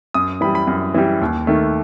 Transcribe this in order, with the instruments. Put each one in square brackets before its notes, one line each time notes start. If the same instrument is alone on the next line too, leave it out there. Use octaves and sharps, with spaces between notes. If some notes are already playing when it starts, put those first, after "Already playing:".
[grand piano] F#2 D#6
E3 G3 B5
B5
F#2
E3 G3
D#2
D#3 A3